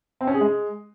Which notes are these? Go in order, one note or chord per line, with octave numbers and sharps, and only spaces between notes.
C4
C#4
G#4
G#3